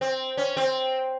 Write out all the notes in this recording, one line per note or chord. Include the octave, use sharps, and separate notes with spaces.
C4
C#4
C4